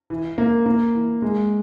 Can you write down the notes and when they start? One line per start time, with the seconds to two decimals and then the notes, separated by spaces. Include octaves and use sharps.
0.10 E3
0.38 A#3
0.66 A#3
0.95 E3
1.22 G#3